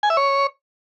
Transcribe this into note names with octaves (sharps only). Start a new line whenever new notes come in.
G#5
E5
C#5